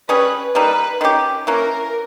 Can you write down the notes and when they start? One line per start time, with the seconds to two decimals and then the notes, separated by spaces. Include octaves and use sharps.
0.09 G3 C#4 G#4 B4
0.55 G3 A#3 D#4 B4
1.01 D#3 G#3 C#4 G4
1.47 E3 A#3 C#4 A#4